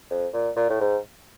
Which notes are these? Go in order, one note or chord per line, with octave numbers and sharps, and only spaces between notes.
F2
A#2
A#2
A2
G#2